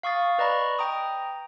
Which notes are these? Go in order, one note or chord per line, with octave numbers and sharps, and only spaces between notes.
F5 C#6 D#6 A6
B4 D5 D#5 A#5 B5 C#6
G5 A#5 D#6